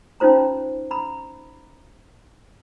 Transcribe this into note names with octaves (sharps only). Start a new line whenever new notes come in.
C#4 D#4 F4 C5 A#5
A#5 B5